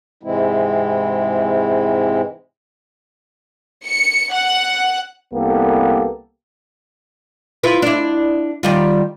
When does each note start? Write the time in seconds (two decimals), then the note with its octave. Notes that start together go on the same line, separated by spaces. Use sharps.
0.23 G#2 C3 E3 G#3 C4 E4
3.84 C#7
4.32 F#5
5.34 C2 A#3 B3 G4 A4
7.63 E4 F4 B4
7.82 D4 E4
8.63 D#3 G3 F4